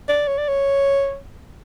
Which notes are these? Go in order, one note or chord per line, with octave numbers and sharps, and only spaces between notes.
D5
C#5
D5
C#5